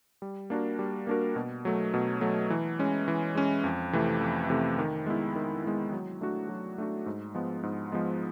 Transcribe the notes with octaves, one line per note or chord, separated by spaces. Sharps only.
G3
A#3 D4 F#4 A#4
G3
A#3 D4 F#4 A#4
B2
F#3 A3
B2
F#3 A3
E3
G#3 C#4
E3
G#3 C#4
F2
C3 E3 A3
F2
C3 E3 A3
D#3
G#3 B3 E4
D#3
G#3 B3 E4
F#3
A3 D4 F#4
F#3
A3 D4 F#4
G#2
F3 G#3 B3
G#2
F3 G#3 B3